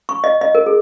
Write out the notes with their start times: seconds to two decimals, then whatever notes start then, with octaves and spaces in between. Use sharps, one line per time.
0.09 C#6
0.24 D#5
0.41 D#5
0.55 A#4
0.66 G#4